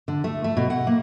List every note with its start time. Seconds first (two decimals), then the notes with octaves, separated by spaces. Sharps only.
0.08 D3
0.24 A3
0.44 A3
0.57 B2
0.70 F#5
0.87 A#3